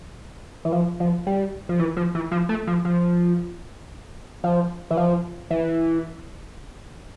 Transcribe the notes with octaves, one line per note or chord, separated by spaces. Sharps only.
E3
F3
F3
G3
F3
E3
F3
E3
F3
A3
F3
F3
F3
E3
F3
E3